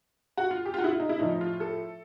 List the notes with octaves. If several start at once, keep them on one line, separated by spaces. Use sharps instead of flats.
F#4
F4
G4
F4
F#4
E4
F4
D#4
E4
A2 F3 D#4
F4
A4